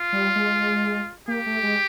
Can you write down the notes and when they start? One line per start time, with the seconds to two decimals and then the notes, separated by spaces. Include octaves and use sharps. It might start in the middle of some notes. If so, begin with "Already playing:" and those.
Already playing: F4
0.12 G3
0.36 G#3
1.28 A#3 G4
1.46 A3
1.63 G#3